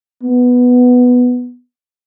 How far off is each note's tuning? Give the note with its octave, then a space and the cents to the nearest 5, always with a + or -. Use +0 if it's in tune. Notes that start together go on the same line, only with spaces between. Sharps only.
B3 +0